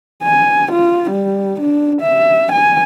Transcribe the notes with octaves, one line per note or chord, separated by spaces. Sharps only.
G#5
F4
G3
D4
E5
G#5